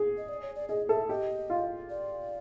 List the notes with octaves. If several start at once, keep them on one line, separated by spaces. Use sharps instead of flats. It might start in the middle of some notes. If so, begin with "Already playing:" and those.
Already playing: G#4
D#5
D5
C#5
D5
G#4 D#5
A4 E5
G4 D#5
F4
D5